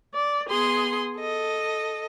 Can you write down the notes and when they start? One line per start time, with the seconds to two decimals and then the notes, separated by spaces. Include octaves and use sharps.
0.14 D5
0.49 B3 G#4 C6 D#6
1.18 A4 D#5